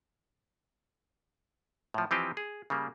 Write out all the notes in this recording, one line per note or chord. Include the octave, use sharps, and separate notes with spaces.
A2 F3
E3 F3 C4 G4 D#5
G#4
C#3 G3 A#3